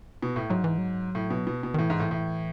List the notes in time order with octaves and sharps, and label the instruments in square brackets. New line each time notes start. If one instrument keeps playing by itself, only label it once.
[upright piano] B2
A2
[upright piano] G#2 [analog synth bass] F#3
[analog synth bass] E3
F#3
[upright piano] A2
B2
B2
B2
[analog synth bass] D#3
[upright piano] A2 [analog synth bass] E3
[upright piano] G#2
A2
A2